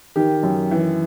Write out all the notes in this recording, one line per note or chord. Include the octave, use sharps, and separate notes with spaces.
D#3 G4
F#2
E3